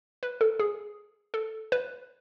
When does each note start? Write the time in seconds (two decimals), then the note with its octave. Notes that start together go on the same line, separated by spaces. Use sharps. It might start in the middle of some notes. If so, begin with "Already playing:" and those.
0.23 B4
0.41 A4
0.59 G#4
1.34 A4
1.72 B4